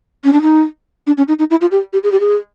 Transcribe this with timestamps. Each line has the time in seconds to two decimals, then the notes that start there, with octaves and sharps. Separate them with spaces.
0.24 C#4
0.33 D4
0.42 D#4
1.07 D4
1.17 C#4
1.28 D#4
1.39 D#4
1.50 E4
1.61 F4
1.71 G4
1.93 G4
2.03 G#4
2.12 G4
2.20 G#4